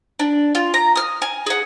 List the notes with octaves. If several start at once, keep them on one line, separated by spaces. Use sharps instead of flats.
D4
F4
A#5
D#6 F6
G#5
G#4 F#5